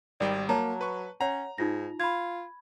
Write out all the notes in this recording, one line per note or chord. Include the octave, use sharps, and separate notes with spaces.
G#1 D#3 G3 D5 G5
F#3 A#3 C#5 A5 A#5
B4 C#6
C#4 C#5 F#5 A#5
G#2 D#4 F4 A#6
F4 B5 G#6